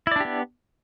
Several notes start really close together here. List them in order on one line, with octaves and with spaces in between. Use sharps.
E4 D5 D4 G4 B3